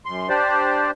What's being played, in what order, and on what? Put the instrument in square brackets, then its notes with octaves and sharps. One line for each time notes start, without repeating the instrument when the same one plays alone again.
[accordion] F#2 C6
D4 G4 C5 D5